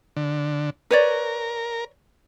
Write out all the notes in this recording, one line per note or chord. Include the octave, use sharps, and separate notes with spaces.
D3
A#4 B4 C#5 D5